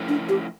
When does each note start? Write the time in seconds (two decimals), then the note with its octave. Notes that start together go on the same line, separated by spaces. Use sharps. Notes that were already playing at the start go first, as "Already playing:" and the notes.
Already playing: F3 A3 C#4 E4 A#4
0.09 D4
0.29 G4